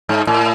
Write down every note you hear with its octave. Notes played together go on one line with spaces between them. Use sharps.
G#2
A2